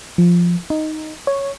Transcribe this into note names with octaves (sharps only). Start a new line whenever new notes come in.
F3
D#4
C#5